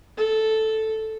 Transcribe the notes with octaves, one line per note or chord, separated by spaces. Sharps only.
A4